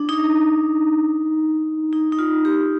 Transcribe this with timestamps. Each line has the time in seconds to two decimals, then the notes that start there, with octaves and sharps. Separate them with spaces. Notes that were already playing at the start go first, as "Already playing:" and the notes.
Already playing: D4
0.09 D#4
1.93 D#4
2.12 D#4
2.19 F4
2.45 G4